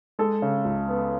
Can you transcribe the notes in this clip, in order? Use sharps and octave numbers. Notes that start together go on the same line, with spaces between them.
G#3 A4
C#3
C#2
B3